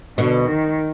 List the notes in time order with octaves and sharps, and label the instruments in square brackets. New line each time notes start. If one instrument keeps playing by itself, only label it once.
[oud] B2 [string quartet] D3
[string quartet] D#3